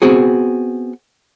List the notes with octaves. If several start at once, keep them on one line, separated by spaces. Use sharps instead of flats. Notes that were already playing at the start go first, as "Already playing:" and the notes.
B3 C4 F#4 G#4